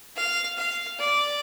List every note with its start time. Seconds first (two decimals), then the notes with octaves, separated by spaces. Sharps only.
0.16 F5
0.57 F5
0.99 D5